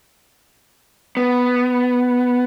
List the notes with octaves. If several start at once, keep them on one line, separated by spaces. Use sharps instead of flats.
B3